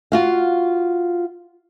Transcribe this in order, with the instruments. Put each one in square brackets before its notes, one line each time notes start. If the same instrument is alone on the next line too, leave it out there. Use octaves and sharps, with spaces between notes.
[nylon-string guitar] F4 F#4 F5